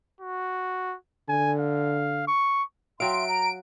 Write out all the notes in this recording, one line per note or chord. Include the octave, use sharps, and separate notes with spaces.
F#4
D3 G#5
F5
C#6
F#3 E5 F5 G5 C6 D7
A#5